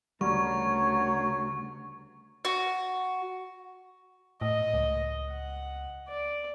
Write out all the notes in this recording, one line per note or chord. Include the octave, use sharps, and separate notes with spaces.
D2 C#3 G3 F#4 A#4 C#5 C#6
F#4
A2 D#5
C#2
F#5
D5